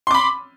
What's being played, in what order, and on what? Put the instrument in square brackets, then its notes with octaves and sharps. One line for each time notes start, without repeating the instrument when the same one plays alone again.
[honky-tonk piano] C6
D6
B5